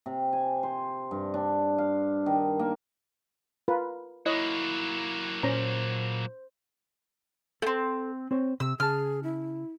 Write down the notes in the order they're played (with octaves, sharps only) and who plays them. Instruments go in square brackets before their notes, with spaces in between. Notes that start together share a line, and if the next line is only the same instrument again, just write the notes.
[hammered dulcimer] C3
G#5
C5
G2
D4
F5
D#3
A#3
[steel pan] F4 A#4 B4
[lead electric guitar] F#3 A#3 [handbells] E4 [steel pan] C#5 D#5
[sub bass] A#2 [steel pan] C#4 A#5 [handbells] C5
[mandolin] A3 C4 [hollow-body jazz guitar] A4
[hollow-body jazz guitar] C4 C5 C#5
[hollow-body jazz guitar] C3 [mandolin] E6
[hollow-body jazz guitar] C#3 A5 [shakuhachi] G#4 [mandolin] F6
[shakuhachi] E4